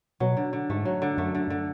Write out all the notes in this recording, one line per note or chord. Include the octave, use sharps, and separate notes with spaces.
B2 F#3
D3
D3
G#2 A3
F#3
D3
F#2 A3
D3
D3